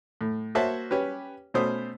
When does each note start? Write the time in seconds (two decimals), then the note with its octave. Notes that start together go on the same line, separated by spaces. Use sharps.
0.21 A2
0.55 A#3 F#4 C5 C#5 E5 A5
0.91 C#4 G4 B4
1.54 B2 A3 C#4 C5 D#6